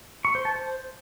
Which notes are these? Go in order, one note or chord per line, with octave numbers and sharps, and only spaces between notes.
C#6
C5
A5
C5